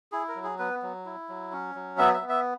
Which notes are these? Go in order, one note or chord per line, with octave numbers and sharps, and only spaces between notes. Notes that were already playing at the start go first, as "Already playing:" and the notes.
E4 G#4
A#4
F#3
G#4
B3 B4
F#3
E4
F#3
C#4
F#3
B3 E5
E5
B3
E5